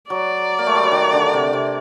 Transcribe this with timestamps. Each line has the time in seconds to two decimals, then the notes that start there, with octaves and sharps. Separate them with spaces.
0.10 F#3 D5
0.59 A#3
0.66 A3
0.75 G3
0.83 F#3
0.92 D#3
1.13 D3
1.33 C3
1.53 C3